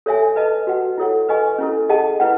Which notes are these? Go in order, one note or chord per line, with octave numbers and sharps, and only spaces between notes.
A4 C#5 E5 G#5
B4 D#5 A5
F#4 B4 F#5
E4 A4 C#5 F#5
B4 D#5 G#5 C#6
C#4 E4 A4
G#4 D#5 F#5 A5
E4 B4 F#5